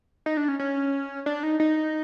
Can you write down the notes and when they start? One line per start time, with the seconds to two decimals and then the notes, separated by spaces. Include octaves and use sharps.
0.26 D#4
0.37 D4
0.48 C#4
0.59 C#4
1.26 D4
1.43 D#4
1.60 D#4